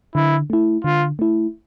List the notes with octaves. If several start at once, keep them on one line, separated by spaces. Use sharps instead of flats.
D3 E4
A3 E4
D3 F4
A3 E4